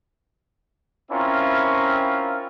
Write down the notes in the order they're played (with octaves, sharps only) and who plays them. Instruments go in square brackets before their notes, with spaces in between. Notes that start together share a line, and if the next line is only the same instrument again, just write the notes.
[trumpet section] C4 C#4 E4 F4 A#4